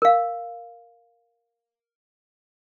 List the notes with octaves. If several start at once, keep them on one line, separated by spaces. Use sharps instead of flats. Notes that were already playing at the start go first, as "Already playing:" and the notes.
A#4 F5